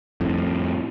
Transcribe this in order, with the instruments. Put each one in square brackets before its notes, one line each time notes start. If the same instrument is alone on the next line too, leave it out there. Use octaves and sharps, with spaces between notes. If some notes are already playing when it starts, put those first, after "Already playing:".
[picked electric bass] F2 A2